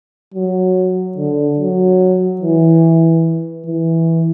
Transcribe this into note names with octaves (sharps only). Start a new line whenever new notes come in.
F#3
D3
F#3
E3
E3